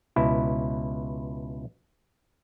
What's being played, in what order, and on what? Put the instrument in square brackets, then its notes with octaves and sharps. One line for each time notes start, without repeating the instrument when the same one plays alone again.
[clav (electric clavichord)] C#2 B2 E4